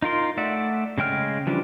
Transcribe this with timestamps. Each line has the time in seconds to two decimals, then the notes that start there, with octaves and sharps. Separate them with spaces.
0.02 D#4 F4 A#4 C6
0.37 A3 D5 E5 F#5
0.98 C#3 G#3 G5 F6
1.47 E3 F3 G3 D4